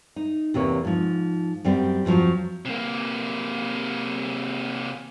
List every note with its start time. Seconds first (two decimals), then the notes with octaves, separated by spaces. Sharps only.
0.16 D#4
0.54 E2 C3 A#3 C#5
0.85 G#2 F3
1.65 F#2 G3 C4
2.05 F2 B2 D3 F3 F#3
2.65 C3 A#3